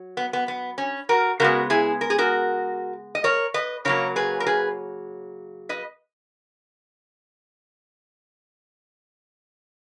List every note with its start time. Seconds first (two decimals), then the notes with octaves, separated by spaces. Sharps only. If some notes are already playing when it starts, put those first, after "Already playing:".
Already playing: F#3
0.17 B3
0.33 B3
0.48 B3
0.78 C#4
1.09 F#4 A#4
1.40 C#3 G#3 B3 F#4 A#4
1.70 E4 G#4
2.01 A#4
2.10 G#4
2.18 F#4 A#4
3.15 D#5
3.24 A#4 C#5
3.54 B4 D#5
3.85 C#3 F#3 A#3 A#4 C#5
4.16 G#4 B4
4.40 A#4
4.46 G#4 B4
5.69 B4 D#5